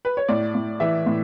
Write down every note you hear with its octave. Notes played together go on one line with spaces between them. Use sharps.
B4
C#5
A2 D5
A2
E3 E5
A2